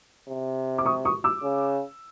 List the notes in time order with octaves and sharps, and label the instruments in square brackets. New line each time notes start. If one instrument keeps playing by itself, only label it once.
[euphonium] C3
[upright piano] D6
C#6 D#6
C#6 D#6
D6 E6
[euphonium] C#3